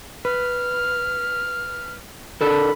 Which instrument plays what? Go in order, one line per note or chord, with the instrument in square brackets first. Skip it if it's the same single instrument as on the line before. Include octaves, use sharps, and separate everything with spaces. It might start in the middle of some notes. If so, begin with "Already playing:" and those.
[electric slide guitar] B4 [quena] F6
[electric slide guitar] D4 A4 A#4 [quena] B5